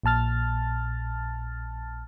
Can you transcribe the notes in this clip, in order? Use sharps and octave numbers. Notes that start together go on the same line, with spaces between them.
A#1 A#2 A5 F6 A6